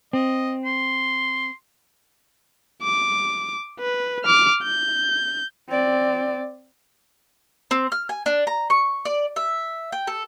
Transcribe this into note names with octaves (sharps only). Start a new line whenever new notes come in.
C4 D#5
C6
D6
B4
D6 F6
G6
C4 D5
C4
F6
G#5
D4
A#5
C#6
D5
E5
G5
A4